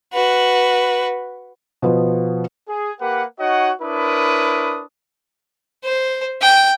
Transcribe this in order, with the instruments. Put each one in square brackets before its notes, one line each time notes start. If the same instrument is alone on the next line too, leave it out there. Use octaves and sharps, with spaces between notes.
[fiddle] F#4 B4
[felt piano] B2 F3 B3 B4
[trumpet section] G#4
A#3 G4 A#4 B4 F#5
D#4 F#4 C#5 D#5 F#5
D4 E4 A#4 B4 C#5 D#6
[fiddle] C5
G5